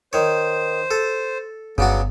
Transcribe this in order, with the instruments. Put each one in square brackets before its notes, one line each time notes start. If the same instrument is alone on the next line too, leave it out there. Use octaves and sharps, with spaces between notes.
[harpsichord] D#3 C#5 [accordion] C5
[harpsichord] A4
[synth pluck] G1 [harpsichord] C#3 D4 F#4 [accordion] F#3 B3